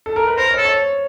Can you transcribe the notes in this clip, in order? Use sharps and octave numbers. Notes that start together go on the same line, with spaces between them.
A4
A#4
B4
A#4 C5
C#5
A4
C#5